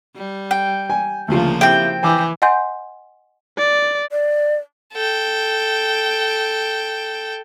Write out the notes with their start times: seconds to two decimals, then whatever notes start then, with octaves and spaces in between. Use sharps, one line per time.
0.16 G3
0.51 G5
0.90 G#5
1.28 D2 C#3 F3 A#3 F4
1.61 C4 E4 G4 G5
2.03 E3 G#5 D6
2.42 D#5 F#5 G#5 C6 G6
3.58 D5
4.11 D5
4.94 A4 G5